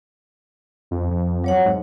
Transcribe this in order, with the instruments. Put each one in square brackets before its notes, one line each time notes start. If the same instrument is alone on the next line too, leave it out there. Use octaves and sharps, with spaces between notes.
[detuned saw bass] F2
F2
[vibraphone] F#3 C#5 F#5
[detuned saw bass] G#2